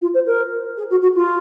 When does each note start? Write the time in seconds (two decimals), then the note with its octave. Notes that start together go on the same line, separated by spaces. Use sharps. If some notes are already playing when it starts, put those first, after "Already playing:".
0.02 F4
0.14 C5
0.27 A#4
0.78 G#4
0.90 F#4
1.02 F#4
1.15 F4